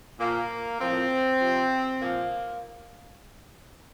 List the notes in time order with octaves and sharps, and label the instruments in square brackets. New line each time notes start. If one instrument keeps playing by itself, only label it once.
[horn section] A#2 F3 A#3
A2 F3 C4
C3 F3
A#2 F3 A#3